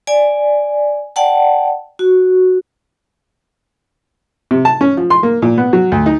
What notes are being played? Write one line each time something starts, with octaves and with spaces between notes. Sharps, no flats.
D5 G#5
D5 F#5 G5 A5
F#4
C3
A5
C#4
F3
C6
A#3
A#2
B3
F#3
D2
D#4